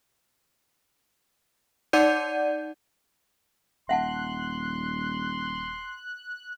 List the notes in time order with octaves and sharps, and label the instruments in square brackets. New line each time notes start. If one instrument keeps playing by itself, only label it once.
[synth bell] D#4 D5 F#5 G6 D#7
[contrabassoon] D#1 [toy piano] E5 F#5 A5 [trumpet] C6 [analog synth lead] F#6